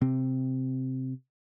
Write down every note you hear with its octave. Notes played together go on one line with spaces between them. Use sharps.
C3 C4